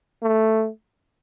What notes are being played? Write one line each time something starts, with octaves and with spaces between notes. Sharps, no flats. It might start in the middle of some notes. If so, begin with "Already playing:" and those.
A3